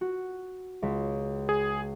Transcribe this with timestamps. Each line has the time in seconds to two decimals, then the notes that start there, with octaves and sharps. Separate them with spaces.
0.01 F#4
0.82 C#2 B6
1.49 G#4